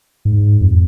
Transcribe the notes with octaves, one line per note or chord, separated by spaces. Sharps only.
G#2
F2